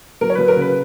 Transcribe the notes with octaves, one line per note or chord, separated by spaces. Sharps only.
F#3 A#4
C#5
F#3 B4
A#4
C#3 B4